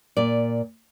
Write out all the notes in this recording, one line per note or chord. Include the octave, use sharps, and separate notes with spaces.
A#2 D5